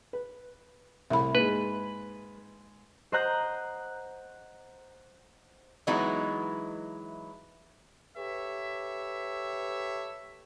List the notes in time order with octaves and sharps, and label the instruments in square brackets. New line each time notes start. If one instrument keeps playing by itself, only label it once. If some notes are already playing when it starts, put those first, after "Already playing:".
[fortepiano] B4
[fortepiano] C2 A2 [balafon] E5 B5
[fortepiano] G#2 G#3 [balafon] A#3 [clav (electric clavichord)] B4
[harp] C5 D#5 F#5 A#5 F#6 G6
[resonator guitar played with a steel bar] E3 F#3 G#3 B3 D#4 E4
[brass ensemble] G4 A4 B4 C#5 E5